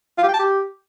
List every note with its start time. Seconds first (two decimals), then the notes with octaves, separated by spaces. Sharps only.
0.18 F4
0.23 G4
0.29 G5
0.34 A5
0.39 G4